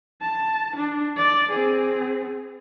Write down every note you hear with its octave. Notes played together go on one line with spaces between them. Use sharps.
A5
D4
D5
C4 G#4